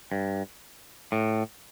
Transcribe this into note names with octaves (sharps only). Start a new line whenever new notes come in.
G2
A2